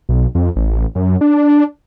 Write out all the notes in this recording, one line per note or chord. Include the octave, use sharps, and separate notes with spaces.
B1
F2
A1
F#2
D4